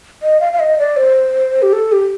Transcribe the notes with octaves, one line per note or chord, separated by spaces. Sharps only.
D#5
F5
F5
D#5
D5
C5
G4
A4
G4